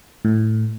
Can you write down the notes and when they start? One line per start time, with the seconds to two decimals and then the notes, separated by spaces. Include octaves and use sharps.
0.25 A2